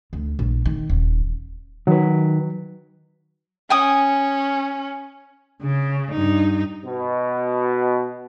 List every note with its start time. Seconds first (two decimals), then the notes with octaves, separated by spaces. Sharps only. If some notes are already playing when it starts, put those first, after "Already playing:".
0.13 D2
0.39 A#1
0.66 D#3
0.90 D#1
1.87 D#3 F#3 B4
3.70 C#4 G5 G#5 D#6
5.62 C#3
6.11 G2 D#4
6.86 B2